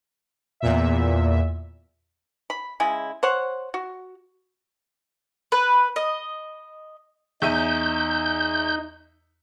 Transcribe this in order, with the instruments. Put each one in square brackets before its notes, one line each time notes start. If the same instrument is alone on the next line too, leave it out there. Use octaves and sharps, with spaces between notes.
[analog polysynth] E2 A#2 E5
[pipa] B5
C#3 G#3 E4
C5 C#5 F#5
F#4
[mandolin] B4
D#5
[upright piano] E2 E5 D#7 [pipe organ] D#4 [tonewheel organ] G6